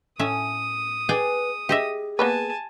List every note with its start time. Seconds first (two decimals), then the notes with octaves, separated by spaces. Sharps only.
0.19 A2 C#4 E5 D#6
1.09 G#4 B4 D5 G5
1.69 G4 G#4 D#5 E5
2.19 A#3 B3 B4 G#5 A5